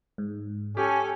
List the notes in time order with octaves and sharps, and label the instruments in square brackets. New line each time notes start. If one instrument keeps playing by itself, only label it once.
[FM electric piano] G#2
[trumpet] C#4 [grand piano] G4 [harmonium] A4 G#5